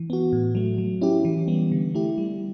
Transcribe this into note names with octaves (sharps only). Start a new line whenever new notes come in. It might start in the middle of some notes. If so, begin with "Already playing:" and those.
Already playing: E3
B3 F#4
A2
F#3 A3
F#3
C#4 E4 G4
E3
G3 B3
D3
A3 E4 G4
G3